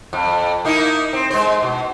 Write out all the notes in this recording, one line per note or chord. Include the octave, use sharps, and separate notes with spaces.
F2
A#3 D#4 E4
C4
G#3 C5
B2